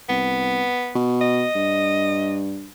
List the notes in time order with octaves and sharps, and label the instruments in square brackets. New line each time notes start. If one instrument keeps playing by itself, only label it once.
[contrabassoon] C2 [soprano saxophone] B3
[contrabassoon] B2
[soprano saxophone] D#5
[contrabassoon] G2